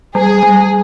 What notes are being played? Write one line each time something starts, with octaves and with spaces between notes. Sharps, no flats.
G3 G#4
G3